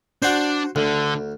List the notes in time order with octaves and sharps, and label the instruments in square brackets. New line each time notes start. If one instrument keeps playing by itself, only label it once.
[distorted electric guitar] D4 [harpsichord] F#4 C5
[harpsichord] D2 [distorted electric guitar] D3